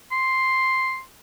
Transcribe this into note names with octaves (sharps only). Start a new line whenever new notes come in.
C6